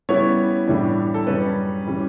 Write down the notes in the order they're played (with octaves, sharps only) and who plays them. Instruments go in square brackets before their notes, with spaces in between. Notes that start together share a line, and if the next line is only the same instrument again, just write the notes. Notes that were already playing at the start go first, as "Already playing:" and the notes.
[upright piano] C#3 G3 B3 E4 C#5
A2 E3 G3 D4
A4
F#2 C#3 G3 C#4 B4
E3 G3 C#4